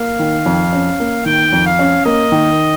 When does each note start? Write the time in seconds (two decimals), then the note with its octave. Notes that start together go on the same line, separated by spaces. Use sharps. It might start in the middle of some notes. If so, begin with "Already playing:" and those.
Already playing: A#3 F5
0.19 D#3
0.46 F2
0.73 C#4
1.00 A#3
1.26 D#3 G5
1.52 F2
1.66 F5
1.79 C#4
2.05 A#3 D#5
2.32 D#3